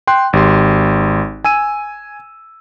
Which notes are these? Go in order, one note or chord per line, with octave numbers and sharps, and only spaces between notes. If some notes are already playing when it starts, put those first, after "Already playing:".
G5 C6 F#6
G#1 G4 C6
G#5 E6 D#7